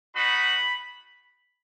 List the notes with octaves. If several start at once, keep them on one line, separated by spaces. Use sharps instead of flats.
B3 D#4 F#4 B5